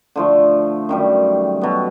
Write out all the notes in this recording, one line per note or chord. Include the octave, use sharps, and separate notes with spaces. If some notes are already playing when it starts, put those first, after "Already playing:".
D3 F3 A3
F#2 D#3 G3
B2 F#3 B3